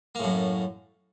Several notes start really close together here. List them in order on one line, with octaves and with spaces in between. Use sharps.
A#3 A2 F#2